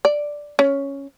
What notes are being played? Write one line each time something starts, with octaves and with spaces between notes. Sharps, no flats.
D5
C#4